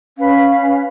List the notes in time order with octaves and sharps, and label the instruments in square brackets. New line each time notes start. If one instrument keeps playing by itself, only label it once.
[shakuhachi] C#4 [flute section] B4 F5